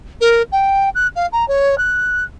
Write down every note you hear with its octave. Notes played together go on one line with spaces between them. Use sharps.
A#4
G5
F#6
F5
A#5
C#5
F#6